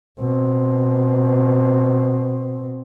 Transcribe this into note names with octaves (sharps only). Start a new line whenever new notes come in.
B2 C4